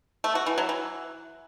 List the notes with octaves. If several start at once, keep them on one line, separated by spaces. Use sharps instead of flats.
A3
F#4
E3
F#3
E3